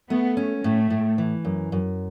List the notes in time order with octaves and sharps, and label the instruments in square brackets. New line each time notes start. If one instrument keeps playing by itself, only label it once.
[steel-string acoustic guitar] A3 [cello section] B3
[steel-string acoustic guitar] C#4
[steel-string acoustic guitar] A2 [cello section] A3
[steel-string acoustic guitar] A2
E3
F#2
F#2